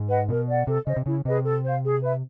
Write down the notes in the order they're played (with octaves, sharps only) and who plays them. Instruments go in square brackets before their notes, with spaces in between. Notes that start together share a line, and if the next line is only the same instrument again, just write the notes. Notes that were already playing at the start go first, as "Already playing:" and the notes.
Already playing: [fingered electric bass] G#2
[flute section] B4 D#5 F#5
[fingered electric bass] B2 [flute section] A#4
[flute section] D5 F#5
[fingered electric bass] C3 [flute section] A4
[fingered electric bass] C#3 [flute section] C5 D#5
[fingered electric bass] C3
[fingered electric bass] C#3 [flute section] E4
[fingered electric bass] C3 [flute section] G#4 B4 D#5
[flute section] A4
C5 F5
G#4
B4 E5